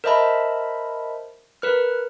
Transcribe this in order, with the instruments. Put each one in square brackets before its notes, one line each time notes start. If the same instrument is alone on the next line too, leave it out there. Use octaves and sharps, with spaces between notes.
[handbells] A#4 C5 D#5 E5 A5 B5
A#4 B4 F6